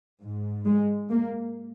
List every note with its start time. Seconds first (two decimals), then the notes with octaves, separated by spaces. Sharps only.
0.25 G#2
0.67 G#3
1.10 A#3